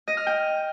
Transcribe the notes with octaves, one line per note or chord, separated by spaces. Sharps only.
D#5
F6
G5